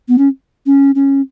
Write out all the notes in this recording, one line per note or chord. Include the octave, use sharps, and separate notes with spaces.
B3
C#4
C#4
C#4